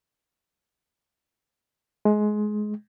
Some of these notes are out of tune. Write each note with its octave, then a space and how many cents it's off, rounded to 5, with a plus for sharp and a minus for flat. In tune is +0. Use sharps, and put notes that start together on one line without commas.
G#3 +20